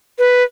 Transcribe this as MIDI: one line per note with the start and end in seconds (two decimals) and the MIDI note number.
0.18 0.43 71